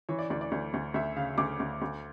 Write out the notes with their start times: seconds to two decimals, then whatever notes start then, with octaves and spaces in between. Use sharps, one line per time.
0.09 E3 C#5
0.19 D5
0.30 D2 D5
0.41 D5
0.52 D2
0.74 D2
0.94 D2 E5
1.16 C#3 F5
1.38 D2 D6
1.60 D2
1.82 D2